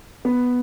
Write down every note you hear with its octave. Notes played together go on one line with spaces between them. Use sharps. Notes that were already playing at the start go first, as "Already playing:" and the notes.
B3